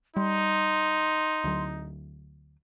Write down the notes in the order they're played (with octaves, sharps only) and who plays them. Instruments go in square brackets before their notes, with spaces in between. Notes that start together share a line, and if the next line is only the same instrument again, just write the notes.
[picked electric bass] G3 [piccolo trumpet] D#4 [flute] C6
[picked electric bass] D2 F#3